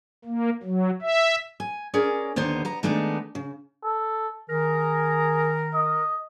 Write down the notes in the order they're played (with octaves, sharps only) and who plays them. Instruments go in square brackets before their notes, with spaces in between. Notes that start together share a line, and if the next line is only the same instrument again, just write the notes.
[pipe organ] A#3
F#3
E5
[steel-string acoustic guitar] G#5
C#4 G#4 A#4 D5
D#2 D3 B3 C5 A#5
B3 A#5
D#3 G#3 A3 B3 D4 D#4
C#3
[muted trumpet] A4
[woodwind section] D#3 A#4 [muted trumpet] G#4
[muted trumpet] D#5